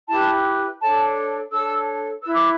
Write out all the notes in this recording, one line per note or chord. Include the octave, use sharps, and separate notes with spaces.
E4 G4 B4 A5
D4 A4 C#5 A5
D4 A4 C#5 E6
E4 B4 E6
D6